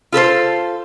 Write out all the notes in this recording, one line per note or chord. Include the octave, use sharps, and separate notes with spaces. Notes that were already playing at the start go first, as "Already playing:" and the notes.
F4 A4 B4 C5